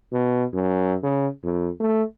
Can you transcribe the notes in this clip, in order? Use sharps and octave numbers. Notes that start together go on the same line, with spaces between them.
B2
F#2
C#3
F2
A3